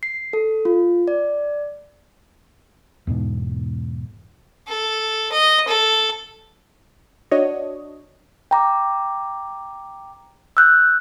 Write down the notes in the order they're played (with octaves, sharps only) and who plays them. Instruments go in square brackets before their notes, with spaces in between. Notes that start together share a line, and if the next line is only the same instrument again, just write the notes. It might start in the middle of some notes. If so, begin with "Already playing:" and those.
[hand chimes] C7
A4
F4
D5
[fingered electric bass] E2 G#2 B2
[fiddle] A4
D#5
A4
[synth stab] D4 F#4 C#5 D#5
[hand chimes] G5 A#5 D6
E6 F#6 G6